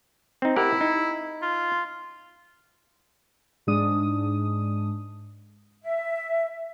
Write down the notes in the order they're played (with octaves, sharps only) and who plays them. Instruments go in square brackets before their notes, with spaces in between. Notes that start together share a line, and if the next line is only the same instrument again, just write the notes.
[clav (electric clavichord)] C4 D#4
[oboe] E4 [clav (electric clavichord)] G4 A#4 F#5
[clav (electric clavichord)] D#4
[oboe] F4
[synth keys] G#2 G#3 D4 D#6
[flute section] E5